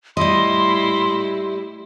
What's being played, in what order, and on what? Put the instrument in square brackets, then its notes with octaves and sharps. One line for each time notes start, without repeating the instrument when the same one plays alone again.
[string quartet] A2 E4 [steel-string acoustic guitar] G3 D#5 [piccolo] C6